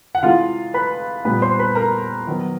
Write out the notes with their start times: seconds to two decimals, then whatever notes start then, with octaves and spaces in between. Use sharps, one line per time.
0.15 F#5
0.23 C3 E3 G#3 F4 F5
0.74 B4 B5
1.25 A#2 G3 B3 B4 B5
1.42 C5 C6
1.59 B4 B5
1.75 A#4 A#5
2.27 D#3 F#3 B3